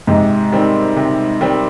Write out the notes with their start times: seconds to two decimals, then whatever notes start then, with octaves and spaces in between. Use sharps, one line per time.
0.07 G#2 C3
0.52 D#3 G3 C4
0.96 C3
1.41 D#3 G3 C4